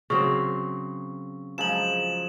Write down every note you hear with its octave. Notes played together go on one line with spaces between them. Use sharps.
C#3 F#3 C4 C#6
F3 F#3 G#3 E7 F#7